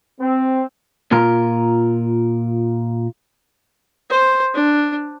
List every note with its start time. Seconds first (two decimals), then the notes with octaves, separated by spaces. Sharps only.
0.20 C4
1.12 A#2 F4 A#4 A#5
4.10 C5
4.54 D4